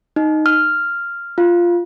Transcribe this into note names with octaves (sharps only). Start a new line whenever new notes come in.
D#4
F6
F4